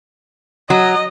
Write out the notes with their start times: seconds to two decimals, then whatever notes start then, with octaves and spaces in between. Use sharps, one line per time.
0.70 F#3 D#5